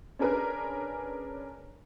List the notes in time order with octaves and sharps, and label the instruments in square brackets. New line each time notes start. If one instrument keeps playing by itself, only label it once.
[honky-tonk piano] C#4 D4 G#4 A#4 B4